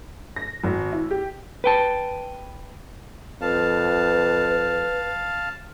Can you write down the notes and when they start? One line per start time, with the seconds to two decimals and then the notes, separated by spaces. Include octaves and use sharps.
0.36 A#6
0.64 G#1
0.92 E4
1.11 G4
1.64 B4 G5 A5
3.41 F2 B4 F5 A5